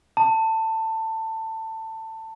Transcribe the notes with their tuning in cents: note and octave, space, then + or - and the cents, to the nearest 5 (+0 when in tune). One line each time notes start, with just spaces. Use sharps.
A5 +20